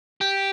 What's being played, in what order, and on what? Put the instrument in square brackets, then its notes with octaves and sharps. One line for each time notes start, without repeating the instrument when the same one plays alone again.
[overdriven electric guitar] G4